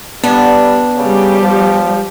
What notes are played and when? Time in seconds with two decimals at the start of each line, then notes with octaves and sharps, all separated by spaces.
0.23 G3 B3 D4
0.97 C#3 G3 G4
1.41 F3